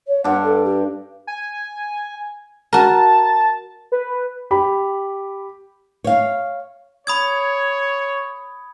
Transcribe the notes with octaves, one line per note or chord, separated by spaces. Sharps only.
C#5
G2 D4 F#5
A4
G4
G#5
F#4 A#4 A5
B4
G4 B5
C#5 F5
C#5 B5 D#6 G#6